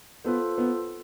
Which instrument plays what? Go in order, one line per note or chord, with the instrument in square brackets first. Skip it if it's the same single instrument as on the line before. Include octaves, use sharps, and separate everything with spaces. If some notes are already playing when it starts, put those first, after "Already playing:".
[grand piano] B3 [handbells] F4 A4 C5
[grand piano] B3